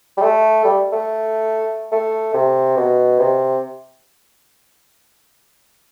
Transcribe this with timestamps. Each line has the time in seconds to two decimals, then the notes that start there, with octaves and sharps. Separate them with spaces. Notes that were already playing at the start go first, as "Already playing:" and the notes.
0.17 G3
0.22 A3
0.65 G3
0.93 A3
1.92 A3
2.34 C3
2.77 B2
3.19 C3